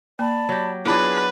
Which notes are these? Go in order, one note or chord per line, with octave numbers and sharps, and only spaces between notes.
A#3 D5 A5 B5
F#3 G4
F#3 B3 D4 E4 F4 G#4 B4 A5